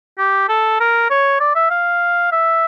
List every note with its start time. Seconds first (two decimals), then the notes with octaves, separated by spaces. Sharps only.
0.19 G4
0.49 A4
0.80 A#4
1.10 C#5
1.40 D5
1.55 E5
1.71 F5
2.32 E5